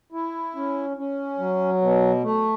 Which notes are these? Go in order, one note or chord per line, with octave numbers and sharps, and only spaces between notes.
E4
C#4
C#4
F#3
B2
A3